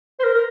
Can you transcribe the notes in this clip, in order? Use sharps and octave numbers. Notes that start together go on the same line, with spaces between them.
C5
A#4
A#4